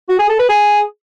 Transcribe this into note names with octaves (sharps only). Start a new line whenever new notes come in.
F#4
G#4
A4
B4
G#4